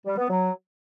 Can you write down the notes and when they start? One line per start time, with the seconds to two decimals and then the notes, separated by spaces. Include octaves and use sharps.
0.06 G3
0.18 B3
0.30 F#3